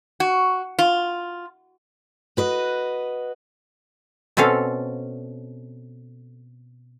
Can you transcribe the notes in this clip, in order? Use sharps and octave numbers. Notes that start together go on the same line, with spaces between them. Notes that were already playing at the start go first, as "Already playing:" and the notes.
F#4
F4
F#4 B4 D#5
B2 C4 C#4 A4 F5